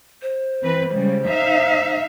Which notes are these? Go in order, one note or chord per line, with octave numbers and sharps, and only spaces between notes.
C5
E3 C4 B4
C#3 G3 G#3
D#4 E5 F5